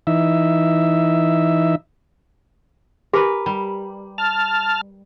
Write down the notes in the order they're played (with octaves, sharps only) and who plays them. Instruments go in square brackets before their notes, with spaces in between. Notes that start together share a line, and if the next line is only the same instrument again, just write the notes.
[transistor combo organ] E3 D#4 E5
[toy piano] G4 G#5 D6 [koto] A#4 B4
[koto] G3
[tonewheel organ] A5 F6